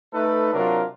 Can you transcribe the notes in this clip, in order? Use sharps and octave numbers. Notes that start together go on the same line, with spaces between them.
A3 D#4 A4 B4
C3 F#3 D4 F4 A#4